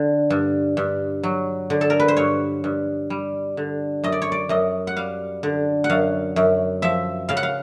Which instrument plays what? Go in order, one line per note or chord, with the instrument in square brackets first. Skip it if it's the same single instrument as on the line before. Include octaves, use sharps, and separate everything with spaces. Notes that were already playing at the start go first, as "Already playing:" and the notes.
Already playing: [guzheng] D3
G2
G2
F#3
D3
A4
A#4
B4
C5
G2 C#5
G2
G3
D3
F#2 D#5
D5
C#5
D5
F#2 D#5
F#5
G3 F5
D3
F#5
F#2 F5
F#2
F3 E5
C#3 F5
F#5
F5